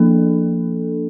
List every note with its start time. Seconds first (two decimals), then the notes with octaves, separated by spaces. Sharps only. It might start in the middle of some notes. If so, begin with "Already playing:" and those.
Already playing: F3 A#3 D4 A4